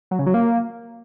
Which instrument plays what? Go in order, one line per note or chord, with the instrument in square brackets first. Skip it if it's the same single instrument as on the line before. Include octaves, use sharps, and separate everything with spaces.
[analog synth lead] F#3
C#3
F#3
A#3